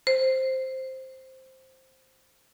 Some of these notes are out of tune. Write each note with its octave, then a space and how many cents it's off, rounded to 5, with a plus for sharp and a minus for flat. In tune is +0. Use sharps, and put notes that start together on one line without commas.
C5 +5